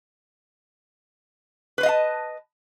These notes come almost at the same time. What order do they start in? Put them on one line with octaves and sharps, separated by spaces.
B4 C5 D#5 F5 A5